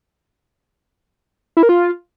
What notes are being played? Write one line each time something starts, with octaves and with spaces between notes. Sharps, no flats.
E4
A#4
F4